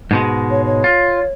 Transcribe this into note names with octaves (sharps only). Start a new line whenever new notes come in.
G#2 B2 G#3
C#5
C#5
F4